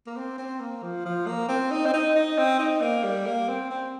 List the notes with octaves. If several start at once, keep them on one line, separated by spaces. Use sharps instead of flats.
A#3
C4
C4
A#3
F3
F3
A#3
C4
D#4
C4
D#4
D#4
C4
D#4
A#3
G3
A#3
C4
C4